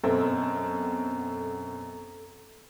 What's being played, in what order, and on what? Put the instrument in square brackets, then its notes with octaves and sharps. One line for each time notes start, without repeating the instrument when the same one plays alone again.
[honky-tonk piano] F#2 B2 C4 [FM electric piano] A4